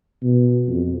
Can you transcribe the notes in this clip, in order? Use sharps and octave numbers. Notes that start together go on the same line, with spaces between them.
B2
F2